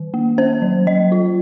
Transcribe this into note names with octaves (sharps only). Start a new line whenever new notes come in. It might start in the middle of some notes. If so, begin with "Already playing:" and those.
Already playing: D#3
A#3
C#4 C5
F#3
F#3 D#5
F4